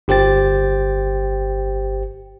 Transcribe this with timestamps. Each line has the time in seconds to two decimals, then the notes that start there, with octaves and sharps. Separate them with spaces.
0.08 G1 G4 C5 G5 A6